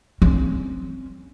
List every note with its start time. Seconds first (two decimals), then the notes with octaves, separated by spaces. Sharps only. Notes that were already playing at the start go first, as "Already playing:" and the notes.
0.22 C4 C#4